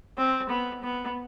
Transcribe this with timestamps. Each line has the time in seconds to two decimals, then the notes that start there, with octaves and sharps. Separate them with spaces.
0.17 C4
0.49 B3
0.83 B3